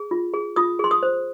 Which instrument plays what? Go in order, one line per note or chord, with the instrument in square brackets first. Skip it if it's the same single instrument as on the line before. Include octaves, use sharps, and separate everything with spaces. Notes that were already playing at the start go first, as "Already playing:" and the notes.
Already playing: [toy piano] G#4
F4
G#4
F4 D#6
G#4 C6
D#6
C5